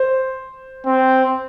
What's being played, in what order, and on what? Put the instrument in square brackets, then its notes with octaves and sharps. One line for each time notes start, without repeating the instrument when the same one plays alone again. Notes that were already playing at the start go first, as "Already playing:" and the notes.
Already playing: [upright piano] C5
[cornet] C4